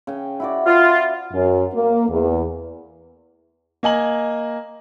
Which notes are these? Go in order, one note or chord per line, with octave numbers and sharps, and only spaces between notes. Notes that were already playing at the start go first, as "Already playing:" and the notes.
C#3 G5
E4 F#4 D5
F4 C5
F#2
A#3
E2
A#3 D#5 G#5 F#7